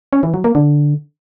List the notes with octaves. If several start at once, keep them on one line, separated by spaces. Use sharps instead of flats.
C#4
E3
F#3
A#3
D3